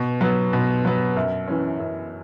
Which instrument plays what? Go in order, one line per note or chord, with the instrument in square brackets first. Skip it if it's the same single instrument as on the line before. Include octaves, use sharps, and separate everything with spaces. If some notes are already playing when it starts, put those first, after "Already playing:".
Already playing: [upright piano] B2
F#3 B3
B2
F#3 B3
F#2
E3 C#4
F#2